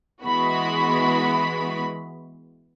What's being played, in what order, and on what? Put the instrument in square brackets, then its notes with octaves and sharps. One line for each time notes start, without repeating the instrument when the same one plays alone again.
[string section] E3 G#3 B3 F#4 B5